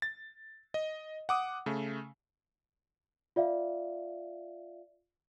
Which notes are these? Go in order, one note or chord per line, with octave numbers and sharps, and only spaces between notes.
A6
D#5
F#5 D6 D#6
C#3 A3
F4 D5 E5 F5